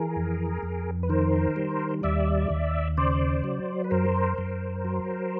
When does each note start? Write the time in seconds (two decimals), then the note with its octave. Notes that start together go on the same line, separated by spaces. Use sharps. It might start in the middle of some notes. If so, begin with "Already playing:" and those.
Already playing: E3 G#4 A#4
0.16 F2
0.63 F2
1.03 B4
1.09 D#3 A#4 C5
1.56 G3
2.03 D#2 D5 E5
2.50 D#2
2.97 C#3 C5 D5
3.44 F#3
3.84 B4
3.91 F#2 A#4 C5
4.38 F#2
4.84 F#3